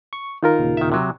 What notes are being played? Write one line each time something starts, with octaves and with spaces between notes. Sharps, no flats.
C#6
D#3 D#4 F4 A#4
D#2 A#2 C#3
D#3 E5
C3 F#3